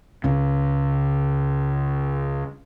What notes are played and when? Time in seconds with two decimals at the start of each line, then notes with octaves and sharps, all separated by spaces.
0.24 C#2 C#3